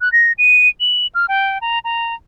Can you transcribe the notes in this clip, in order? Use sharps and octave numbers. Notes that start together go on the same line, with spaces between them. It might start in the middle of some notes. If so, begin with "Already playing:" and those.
F#6
A#6
D#7
F#7
F6
G5
A#5
A#5